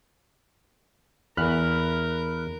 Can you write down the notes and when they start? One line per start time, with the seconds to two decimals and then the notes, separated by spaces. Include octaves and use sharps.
1.37 E2 A#4 B5 F6 F#6